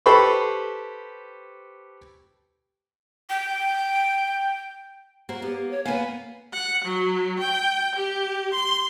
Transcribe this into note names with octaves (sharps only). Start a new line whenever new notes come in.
G4 A4 B4 C5 B5 C#6
G5
A#3 F#4 C5
A#3 B3 G4
C#5
A#3 B3 B4 F5 G#5
F#5
F#3
G5
G4
C6